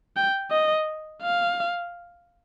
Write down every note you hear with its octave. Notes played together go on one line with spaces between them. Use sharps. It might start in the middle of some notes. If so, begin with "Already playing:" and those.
G5
D#5
F5